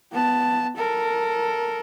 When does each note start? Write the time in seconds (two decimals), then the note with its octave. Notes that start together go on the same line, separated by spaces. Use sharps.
0.12 B3 A5
0.77 A4 A#4